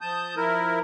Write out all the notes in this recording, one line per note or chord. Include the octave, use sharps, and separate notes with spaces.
F3 A5 D#6 G6
F3 E4 A#4